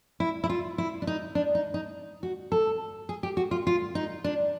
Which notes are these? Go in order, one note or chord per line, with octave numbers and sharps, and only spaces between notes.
E4
E4
F4
E4
D4
D#4
D4
D#4
D#4
F#4
A4
G#4
G4
F#4
F4
F4
D#4
D4